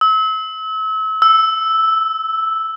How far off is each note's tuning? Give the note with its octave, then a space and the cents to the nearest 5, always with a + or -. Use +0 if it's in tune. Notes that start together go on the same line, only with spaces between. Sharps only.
E6 -35
E6 -5